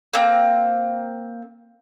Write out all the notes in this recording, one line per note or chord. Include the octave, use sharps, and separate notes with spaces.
A#3 C4